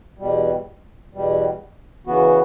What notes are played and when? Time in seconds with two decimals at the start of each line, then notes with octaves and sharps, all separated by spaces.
0.18 E2 B2 G3
1.13 E2 B2 G3
2.06 C#3 E3 B3 F#4